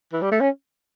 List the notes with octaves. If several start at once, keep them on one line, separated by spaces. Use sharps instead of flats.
E3
G3
A3
C#4